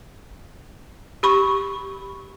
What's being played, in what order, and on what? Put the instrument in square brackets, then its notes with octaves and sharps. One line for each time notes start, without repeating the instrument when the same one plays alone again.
[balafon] G4 B5 C#6